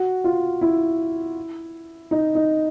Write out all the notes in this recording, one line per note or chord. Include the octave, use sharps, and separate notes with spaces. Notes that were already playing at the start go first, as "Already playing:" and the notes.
Already playing: F#4
F4
E4
D#4
D#4